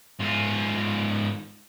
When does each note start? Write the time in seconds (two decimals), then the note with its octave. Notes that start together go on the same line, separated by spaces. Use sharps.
0.20 G#2 F4